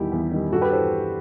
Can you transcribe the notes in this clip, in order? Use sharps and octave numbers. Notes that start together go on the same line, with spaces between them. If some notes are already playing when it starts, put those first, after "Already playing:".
Already playing: E2 D#3 G3 E4 G4
E2
D#3 G3
G2 F#4 A4
G4 B4
E3 A4 C5